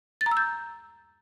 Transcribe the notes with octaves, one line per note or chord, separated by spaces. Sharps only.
A6
A#5
E6
G6